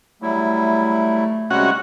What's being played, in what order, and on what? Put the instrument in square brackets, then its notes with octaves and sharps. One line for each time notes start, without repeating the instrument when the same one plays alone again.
[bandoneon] F#3 G3 E4 [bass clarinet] A3
[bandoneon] C3 G3 G#3 [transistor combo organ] C#4 F#4 F#5